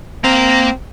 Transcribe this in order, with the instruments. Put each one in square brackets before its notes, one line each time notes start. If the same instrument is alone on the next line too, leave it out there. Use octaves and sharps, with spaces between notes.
[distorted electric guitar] A#3 A#5 [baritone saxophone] C4